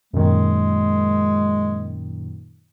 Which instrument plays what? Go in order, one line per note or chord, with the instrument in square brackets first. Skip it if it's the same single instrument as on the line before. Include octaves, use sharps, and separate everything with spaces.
[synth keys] F#2 A#2 D#3 [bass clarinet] G#3